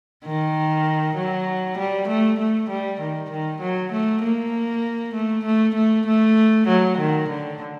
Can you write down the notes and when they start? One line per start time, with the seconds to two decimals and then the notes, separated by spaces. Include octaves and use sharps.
0.25 D#3
1.16 F#3
1.78 G3
2.08 A3
2.39 A3
2.70 G3
3.00 D#3
3.31 D#3
3.61 F#3
3.92 A3
4.23 A#3
5.14 A3
5.45 A3
5.75 A3
6.07 A3
6.68 F#3
6.98 D#3
7.29 D3